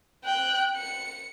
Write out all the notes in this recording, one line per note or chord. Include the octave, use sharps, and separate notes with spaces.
G5 F#6
C#7